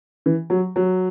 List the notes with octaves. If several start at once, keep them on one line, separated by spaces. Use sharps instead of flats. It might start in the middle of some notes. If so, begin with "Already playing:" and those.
E3
F#3
F#3